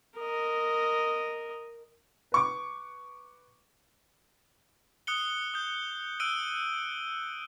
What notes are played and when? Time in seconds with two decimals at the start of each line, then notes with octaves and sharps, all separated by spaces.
0.18 A#4 D#5
2.32 B4 C#6 D6
5.07 D#6 F#6 C#7 G7
5.54 D#6 G6
6.20 E6 F#6 D7 D#7 G7